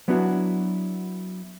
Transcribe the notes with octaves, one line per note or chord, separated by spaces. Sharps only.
F#3 B3 D4 E4 F#4